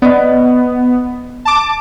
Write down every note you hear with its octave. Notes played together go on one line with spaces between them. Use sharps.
B3 D5 D#5
A5 D6